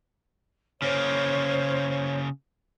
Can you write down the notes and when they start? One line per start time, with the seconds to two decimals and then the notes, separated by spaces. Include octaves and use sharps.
0.82 C#3 A#3 C5 C#5